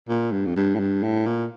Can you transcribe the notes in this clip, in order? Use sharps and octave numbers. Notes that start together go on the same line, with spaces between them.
A#2
G2
F2
G2
A2
G2
A2
A#2